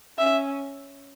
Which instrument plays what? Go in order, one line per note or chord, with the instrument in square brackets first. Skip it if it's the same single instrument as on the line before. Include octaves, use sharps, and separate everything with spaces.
[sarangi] C#4 [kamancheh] E5